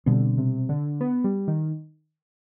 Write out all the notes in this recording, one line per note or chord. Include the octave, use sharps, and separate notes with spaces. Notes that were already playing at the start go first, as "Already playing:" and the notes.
B2 D3 G3 C4
C3
D3
B3
G3
D#3